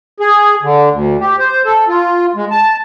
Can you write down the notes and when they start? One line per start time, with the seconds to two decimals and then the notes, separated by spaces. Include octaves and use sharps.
0.20 G#4
0.63 D3
0.92 D2
1.21 G4
1.39 C5
1.66 A4
1.88 F4
2.35 G#3
2.51 A5